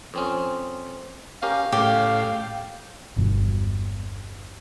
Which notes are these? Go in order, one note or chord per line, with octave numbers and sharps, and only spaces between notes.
F2 C4 C#4
C#4 G4 A#4 F5
A2 C#3 G4
G1 E2 G2 B2